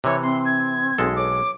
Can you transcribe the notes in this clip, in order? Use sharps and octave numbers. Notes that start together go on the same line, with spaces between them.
C3 E3 C#5
C4 C6
G#6
B1 G#3 A4
C#5 D6